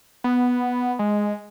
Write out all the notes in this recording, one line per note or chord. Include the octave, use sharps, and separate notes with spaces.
B3
G#3